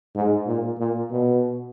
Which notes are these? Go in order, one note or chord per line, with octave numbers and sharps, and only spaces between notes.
G#2
A#2
A#2
B2